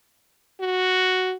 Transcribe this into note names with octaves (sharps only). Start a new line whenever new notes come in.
F#4